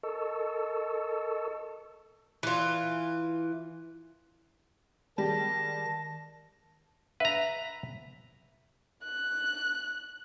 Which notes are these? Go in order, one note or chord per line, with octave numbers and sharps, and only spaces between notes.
A4 A#4 D#5 A5 C#6 E6
E3 F4
D#3 G3 G#3 G4 A5 A#6
B4 E5 A#5
F#6